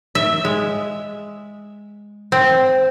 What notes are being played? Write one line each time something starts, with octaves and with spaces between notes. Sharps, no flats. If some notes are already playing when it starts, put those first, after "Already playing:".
E5
G#3
C4